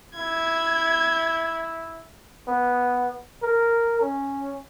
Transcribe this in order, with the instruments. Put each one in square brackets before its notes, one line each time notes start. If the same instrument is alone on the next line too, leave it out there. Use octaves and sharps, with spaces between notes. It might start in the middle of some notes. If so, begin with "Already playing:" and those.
[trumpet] E4 [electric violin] G#6
[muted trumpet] B3
A#4
C#4